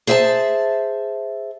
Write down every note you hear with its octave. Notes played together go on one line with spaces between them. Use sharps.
G#4 C5 E5 G#5 A5